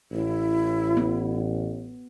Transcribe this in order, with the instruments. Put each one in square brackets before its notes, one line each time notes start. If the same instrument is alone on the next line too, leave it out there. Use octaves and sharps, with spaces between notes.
[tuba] A1 [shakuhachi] E4
[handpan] B3